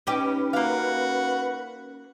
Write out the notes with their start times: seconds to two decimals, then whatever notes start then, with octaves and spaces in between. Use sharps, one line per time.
0.07 C#4 D#4 G4 B4
0.53 A#3 F#4 F5